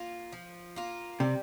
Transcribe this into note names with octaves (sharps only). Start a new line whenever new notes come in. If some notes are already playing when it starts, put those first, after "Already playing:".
Already playing: A#3 F4
F3
A#3 F4
C3 G3